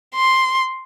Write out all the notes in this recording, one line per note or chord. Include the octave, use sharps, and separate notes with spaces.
C6